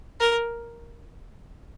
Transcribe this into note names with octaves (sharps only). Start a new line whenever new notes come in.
A#4